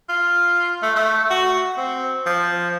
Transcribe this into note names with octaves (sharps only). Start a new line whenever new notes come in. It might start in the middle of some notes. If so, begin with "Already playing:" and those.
F4
A3
A3
F#4
C4
F3